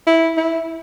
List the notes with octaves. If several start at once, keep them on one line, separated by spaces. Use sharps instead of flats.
E4
E4